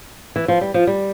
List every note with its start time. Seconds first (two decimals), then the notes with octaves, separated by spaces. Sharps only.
0.36 E3
0.48 F3
0.61 G3
0.74 F3
0.87 G3